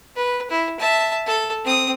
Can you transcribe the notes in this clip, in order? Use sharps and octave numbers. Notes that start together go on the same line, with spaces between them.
B4
E4
E5 A5
A4
C4 D#6